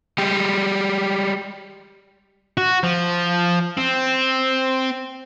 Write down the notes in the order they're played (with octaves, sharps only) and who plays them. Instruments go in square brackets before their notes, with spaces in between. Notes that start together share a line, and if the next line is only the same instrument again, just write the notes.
[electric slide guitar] G3 G#3 G4
[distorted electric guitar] F#4
F3
C4